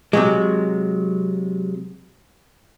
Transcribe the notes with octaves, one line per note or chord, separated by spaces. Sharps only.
C3 F#3 G#3